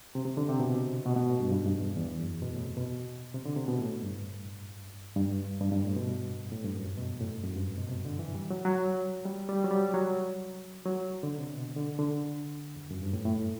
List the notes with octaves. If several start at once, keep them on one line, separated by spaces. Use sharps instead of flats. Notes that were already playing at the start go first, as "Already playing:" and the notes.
C3
C3
D3
C3
B2
B2
B2
A2
G2
G2
G2
E2
E2
F#2
B2
A2
C3
B2
C3
D3
C3
B2
A2
G2
G2
G2
G2
A2
B2
A2
G2
F#2
E2
B2
A2
F#2
G2
A2
B2
C3
D3
E3
G3
F#3
F#3
G3
G3
F#3
G3
F#3
F#3
D3
C3
B2
D3
D3
E2
F#2
G2
A2
A2